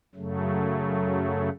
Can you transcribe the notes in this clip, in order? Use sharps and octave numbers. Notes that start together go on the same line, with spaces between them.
F#2 C#3 F#3 A3